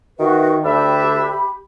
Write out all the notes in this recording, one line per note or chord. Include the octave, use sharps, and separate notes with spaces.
D#3 F#4 B4 E5
D2 D4 G4 E5 B5